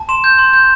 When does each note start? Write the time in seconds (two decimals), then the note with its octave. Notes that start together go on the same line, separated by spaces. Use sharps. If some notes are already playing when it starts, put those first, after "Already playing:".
Already playing: A5
0.09 C6 E7
0.24 G6
0.39 C6
0.53 G6